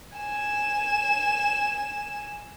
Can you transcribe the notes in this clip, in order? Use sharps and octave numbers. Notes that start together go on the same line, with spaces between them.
G#5 E7